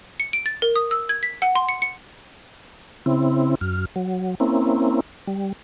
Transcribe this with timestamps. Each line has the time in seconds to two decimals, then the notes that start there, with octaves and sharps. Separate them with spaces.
0.20 C#7
0.33 D7
0.46 A6
0.62 A#4
0.75 D#6
0.91 E6
1.09 G#6
1.23 B6
1.42 F#5
1.55 C6
1.69 C#7
1.82 C#7
3.06 C#3 C4 E4
3.61 F#2 F6
3.96 F#3
4.40 A#3 C4 C#4 E4
5.27 G3